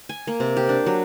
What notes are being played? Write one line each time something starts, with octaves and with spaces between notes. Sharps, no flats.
G#5
A#3
C3
G4
D4
F#3